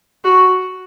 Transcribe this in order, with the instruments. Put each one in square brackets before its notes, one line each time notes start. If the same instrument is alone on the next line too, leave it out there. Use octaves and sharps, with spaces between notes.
[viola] F#4